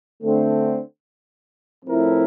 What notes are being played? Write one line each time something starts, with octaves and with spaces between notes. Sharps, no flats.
D3 A3 C4
A2 F3 C4 E4 A#4